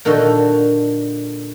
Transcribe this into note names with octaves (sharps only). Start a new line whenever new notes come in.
A#2 D3 D#3 F#4 A4 C6